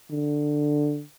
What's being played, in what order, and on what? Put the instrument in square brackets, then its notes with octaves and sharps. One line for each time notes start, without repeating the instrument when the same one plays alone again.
[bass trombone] D3